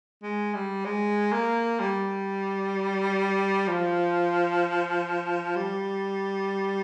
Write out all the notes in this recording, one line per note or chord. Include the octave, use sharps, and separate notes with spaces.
G#3
G3
G#3
A#3
G3
F3
G3